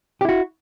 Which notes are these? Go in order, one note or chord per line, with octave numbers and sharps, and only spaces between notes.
E4 F#4 G4